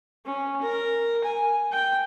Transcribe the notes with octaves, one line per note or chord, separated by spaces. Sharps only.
C#4
A#4
G#5
G5